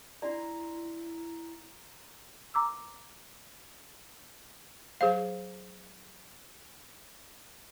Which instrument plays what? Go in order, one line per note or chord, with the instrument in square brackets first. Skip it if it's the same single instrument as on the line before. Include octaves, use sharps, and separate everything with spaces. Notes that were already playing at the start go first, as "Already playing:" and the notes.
[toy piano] D4 F4 D5 [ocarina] E4 [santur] A#5 C6
[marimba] A#5 D6 E6
[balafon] F#3 G#4 C5 F5